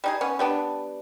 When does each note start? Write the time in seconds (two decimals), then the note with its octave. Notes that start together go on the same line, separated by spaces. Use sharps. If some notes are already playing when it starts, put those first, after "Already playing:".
0.04 G3 D#4 G#4
0.21 B3 C#4
0.39 G3 B3 D4